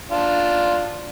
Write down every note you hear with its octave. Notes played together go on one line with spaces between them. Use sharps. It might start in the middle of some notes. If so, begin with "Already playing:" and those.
D4 F4